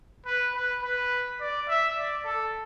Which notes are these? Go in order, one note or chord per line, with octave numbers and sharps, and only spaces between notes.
B4
B4
B4
D5
E5
D5
A4